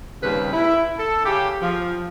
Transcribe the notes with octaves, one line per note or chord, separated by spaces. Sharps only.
D#2 C#3 G3 C4 B4
E4
A4
C#3 G4
F3